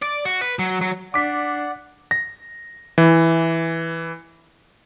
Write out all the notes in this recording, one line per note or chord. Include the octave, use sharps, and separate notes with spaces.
D5
F#4
B4
F#3
F#3
D4 D5 F#5 D6 B6
A#6
E3